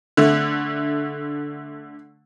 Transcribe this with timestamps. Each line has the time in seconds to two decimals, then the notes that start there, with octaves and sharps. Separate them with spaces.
0.17 D3 A3